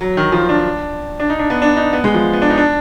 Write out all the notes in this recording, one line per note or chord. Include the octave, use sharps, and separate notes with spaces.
F#3
D#3
F3
D4
D4
D#4
D4
B3
D4
D#4
B3
G#3
F3
B3
D4
D#4
D4